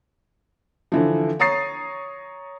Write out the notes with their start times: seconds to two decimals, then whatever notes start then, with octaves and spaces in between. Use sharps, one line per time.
0.92 D3 E3 F3
1.39 C#5 A#5 C#6 D#6 A6 C7